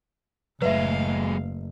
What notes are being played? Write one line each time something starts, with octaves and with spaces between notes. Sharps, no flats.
F#1 A2 F#3 G#3 B4 E5 F5